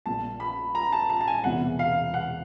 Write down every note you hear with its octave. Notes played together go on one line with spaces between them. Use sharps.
A#1 A#2 A5
B5
A#5
A5
A5
A5
G#5
E1 E2 C3 E3 F#5
F5
F#5